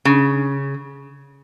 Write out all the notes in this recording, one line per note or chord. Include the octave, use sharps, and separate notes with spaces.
C#3